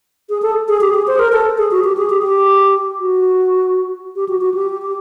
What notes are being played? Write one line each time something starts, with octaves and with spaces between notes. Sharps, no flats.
G#4
A4
G#4
G4
G#4
C5
A#4
A4
G#4
F#4
G4
G#4
G4
G4
F#4
G4
F#4
F#4
G4
G4